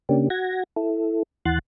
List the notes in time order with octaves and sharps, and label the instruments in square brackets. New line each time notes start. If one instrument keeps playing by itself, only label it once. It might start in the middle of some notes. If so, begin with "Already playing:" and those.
[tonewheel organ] C#3 A#3 C#4 D4 G4
F#4 F#5 G#6 A#6
E4 A4
D#2 E3 F#5 C6 F#6 A6